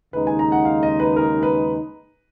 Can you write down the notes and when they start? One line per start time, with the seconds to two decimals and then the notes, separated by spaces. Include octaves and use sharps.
0.13 D#2 C#3 G#3 D#4 B4
0.27 G#5
0.39 A#5
0.52 F#5
0.65 F5
0.83 D#5
1.00 B4
1.16 A#4
1.43 B4